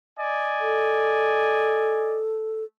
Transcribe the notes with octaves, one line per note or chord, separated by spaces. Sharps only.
D5 D#5 G#5
A4